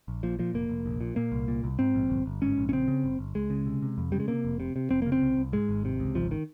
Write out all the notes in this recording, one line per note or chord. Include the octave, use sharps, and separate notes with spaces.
A#1
A#2 F3
A#2 F3
F1 A#3
F1
A#1
A#2
A#2 A#3
C2
A#2
C2
G#2 C4
A#1
G1
G1
G#2 C#4
A#1
C#4
C#3 C4
C#3
G1
G1
C#2 G#3
C#3
C3
C3
F2
C#3 G3
G#3
C3 A#3
F1
C3
C3
F1 C4
C#3 A#3
C4
C2
C2
G#2 G#3
G#1
C3
C#2
G#1 F3
D#3